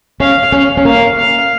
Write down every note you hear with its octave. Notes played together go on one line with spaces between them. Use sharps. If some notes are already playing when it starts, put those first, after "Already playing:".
C#4 F5
C#4 F5
C#4
A#3 F5
F5